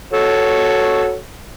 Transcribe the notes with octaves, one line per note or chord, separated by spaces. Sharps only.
F#4 A4 C#5